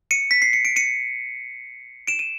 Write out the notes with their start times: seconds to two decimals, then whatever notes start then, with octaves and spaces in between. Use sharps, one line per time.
0.11 C#7 D#7
0.31 B6
0.42 C7
0.53 C#7
0.65 D7
0.76 C#7 D#7
2.07 D7 E7
2.19 D#7